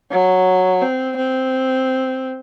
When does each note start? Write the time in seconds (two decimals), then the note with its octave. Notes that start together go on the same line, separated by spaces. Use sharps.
0.11 F#3
0.82 C4
1.17 C4